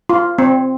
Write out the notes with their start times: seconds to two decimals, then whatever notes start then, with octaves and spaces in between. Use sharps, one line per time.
0.09 F4
0.39 C4